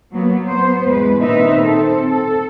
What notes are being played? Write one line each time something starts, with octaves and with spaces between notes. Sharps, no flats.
F#3 A#3 B3
B3 C5
E2 G#3 B4
A#2 D#3 C4 D#4 B4 E5
C4 A4
A4